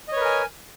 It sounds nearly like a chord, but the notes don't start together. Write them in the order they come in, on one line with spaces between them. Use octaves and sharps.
D#5 C#5 B4 A#4 G#5